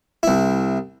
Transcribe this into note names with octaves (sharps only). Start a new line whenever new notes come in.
C2 E4